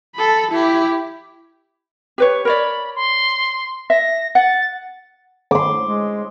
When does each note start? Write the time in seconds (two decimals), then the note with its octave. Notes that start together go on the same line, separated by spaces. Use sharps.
0.15 A4 B5
0.51 E4 G4
2.18 G4 B4 C#5
2.45 A#4 C#5 D5 B5
2.95 C6
3.90 E5 A#6
4.35 F#5 A6
5.51 C6 D6
5.82 G#3